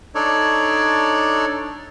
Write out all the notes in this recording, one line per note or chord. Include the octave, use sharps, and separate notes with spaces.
D4 D#4 A4 C#5 D5